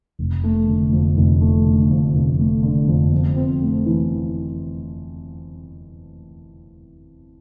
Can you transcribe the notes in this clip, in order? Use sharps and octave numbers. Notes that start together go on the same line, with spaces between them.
F1
A3
D3
F2
F1
A3
D3
F2
F1
A3
D3
F2
F2
C4
A3
E3